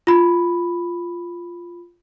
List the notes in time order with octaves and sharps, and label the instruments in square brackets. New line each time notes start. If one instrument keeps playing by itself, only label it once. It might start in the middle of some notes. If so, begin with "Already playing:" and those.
[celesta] F4 B5